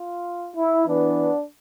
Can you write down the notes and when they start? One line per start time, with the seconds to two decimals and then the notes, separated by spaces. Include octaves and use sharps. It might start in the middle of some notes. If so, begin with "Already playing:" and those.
Already playing: F4
0.55 E4
0.86 E3 B3 D4